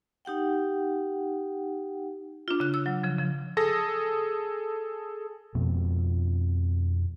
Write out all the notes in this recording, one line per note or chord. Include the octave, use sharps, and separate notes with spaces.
D#4 G4 F#5 G5
D4 F4
C#3 F#6
E6
F#3
C#3 F3
C#3 F3
G#4 A4 D#6 A#6
F2 B2 F3 C4